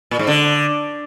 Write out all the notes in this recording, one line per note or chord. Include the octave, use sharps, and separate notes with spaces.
A#2
G#2
D3